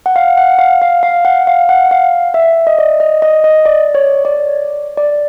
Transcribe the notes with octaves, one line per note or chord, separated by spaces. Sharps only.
F#5
F5
F#5
F5
F5
F5
F#5
F5
F#5
F5
E5
D#5
D5
D#5
D#5
D#5
D5
C#5
D5
D5